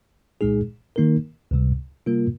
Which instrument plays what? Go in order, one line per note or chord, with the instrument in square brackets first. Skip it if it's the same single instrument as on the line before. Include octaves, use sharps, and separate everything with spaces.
[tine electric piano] C2 A#2 G#3 D#4 G#4
D#3 A#3 D#4 A#4
C#2 C3 G3
C3 G3 A#3 F4 A#4